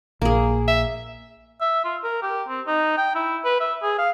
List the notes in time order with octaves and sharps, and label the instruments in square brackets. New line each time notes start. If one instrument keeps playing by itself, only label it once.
[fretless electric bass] A#1 [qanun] A#3 G#4
[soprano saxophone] E5
[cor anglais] E5
F4
A#4
G4
C4
D#4
G5
E4
B4
E5
G#4
F5